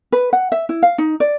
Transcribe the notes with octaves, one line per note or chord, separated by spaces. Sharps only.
B4
F#5
E5
E4
F5
D#4
D5